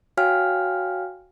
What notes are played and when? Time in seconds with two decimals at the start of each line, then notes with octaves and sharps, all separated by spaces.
0.17 F#4 C#5 F5 G5 G#5 F6